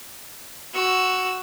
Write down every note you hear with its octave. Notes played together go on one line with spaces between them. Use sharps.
F#4 E6